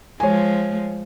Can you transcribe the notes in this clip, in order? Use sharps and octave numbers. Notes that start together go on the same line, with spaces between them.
F3 G#3 C#5 G#5